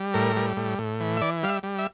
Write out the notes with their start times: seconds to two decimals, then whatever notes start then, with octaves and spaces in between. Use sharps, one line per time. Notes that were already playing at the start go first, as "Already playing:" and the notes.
Already playing: G3
0.14 A2 A#4
0.36 G3
0.57 A2
0.79 A2
1.00 E3
1.17 E5
1.21 E3 D5
1.43 G3 F5
1.49 E5
1.63 G3
1.79 E5